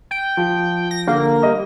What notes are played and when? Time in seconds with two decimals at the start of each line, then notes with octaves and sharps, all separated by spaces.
0.11 G5
0.37 F3
0.91 A#6
1.07 D3 A#3
1.43 G3 D#5